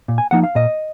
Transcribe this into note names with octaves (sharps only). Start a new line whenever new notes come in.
A#2
G#5
F3 A#3 D#4 F#5
F5
A#2 D#5